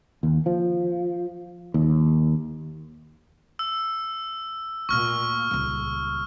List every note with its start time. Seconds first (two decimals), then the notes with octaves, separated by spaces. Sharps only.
0.23 D#2
0.46 F3
1.74 D#2
3.59 E6
4.89 D2 A#2 C#6 F6
5.51 D#1 C#2